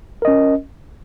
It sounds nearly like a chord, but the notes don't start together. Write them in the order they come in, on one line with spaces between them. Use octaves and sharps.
A#4 D#5 C#4